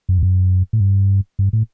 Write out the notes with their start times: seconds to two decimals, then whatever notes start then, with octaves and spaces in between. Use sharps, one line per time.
0.09 F#2
0.18 E2
0.23 F#2
0.73 A2
0.80 G2
1.39 G2
1.53 A2